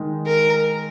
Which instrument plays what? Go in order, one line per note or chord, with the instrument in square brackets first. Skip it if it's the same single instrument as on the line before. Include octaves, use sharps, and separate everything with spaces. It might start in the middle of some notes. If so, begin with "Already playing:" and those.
Already playing: [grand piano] D#3 G#3 D#4
[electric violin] A#4